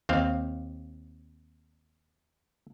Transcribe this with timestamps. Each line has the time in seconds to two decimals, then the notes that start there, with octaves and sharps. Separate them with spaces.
0.09 D#2 C4 F5